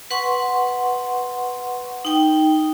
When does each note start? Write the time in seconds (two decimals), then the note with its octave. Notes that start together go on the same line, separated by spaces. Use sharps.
0.11 B4 F#5 C6 C#6
2.05 D#4 G5